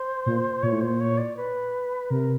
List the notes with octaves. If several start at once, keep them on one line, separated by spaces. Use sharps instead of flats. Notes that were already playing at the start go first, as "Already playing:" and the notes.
Already playing: C5
A#2
A#2 C#5
A2
A#2 C5
C#5
D5
B4
C3 A#4